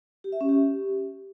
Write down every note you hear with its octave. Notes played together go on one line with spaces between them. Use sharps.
G4
E5
C#4
G4